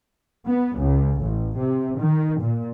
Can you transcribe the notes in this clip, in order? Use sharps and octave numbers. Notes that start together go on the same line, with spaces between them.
B3
C#2
A1
C3
D#3
A#2